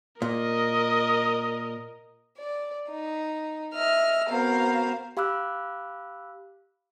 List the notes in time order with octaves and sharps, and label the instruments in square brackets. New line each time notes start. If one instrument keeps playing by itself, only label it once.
[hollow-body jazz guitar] A#2 [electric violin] A#4 D#5
[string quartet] D5
D#4
D#5 E5 F6
B3 C4 F#4 A#4 C5 F5
[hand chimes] G4 F5 B5 D6 E6 F#6